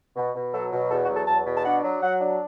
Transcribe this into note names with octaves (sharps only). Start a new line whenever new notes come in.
B2
B2
F#3 A4
B2
E2 A4
F#4
F#3
A4
E2 A5
B2
A5
D4 F#5
F#3
F#3 F#5
D4